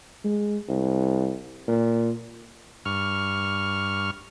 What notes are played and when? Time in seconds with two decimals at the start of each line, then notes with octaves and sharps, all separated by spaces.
0.24 G#3
0.69 C2
1.68 A#2
2.86 G2 C#6 F6